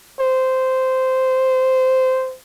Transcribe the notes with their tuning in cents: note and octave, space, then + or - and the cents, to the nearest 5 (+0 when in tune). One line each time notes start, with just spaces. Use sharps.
C5 -10